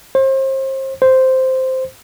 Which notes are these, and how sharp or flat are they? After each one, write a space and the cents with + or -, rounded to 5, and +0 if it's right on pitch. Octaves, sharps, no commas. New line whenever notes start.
C5 +35
C5 -5